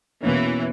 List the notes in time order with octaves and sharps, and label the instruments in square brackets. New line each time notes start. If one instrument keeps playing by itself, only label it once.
[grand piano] B2 A#3 C#4 [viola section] E3